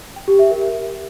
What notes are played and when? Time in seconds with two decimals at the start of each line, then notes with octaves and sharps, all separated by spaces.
0.16 G5
0.28 G4
0.39 E5
0.50 A#4